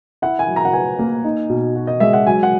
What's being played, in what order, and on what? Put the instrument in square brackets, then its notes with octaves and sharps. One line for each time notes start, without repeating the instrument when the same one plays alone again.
[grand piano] E4 [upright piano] F#5
[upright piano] G#5
[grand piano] F#3
[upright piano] A#5
F#5
[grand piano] B4 [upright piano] G#5
[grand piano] A#3
D#4
B2
F#4
[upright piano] D#5
[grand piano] G#3 [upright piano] E5
[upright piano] F#5
[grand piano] F#3 [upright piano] G#5
[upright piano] F#5